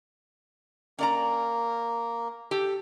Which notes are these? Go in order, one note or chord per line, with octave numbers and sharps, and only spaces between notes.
A#3 C#4 D5 A#5
G4 A4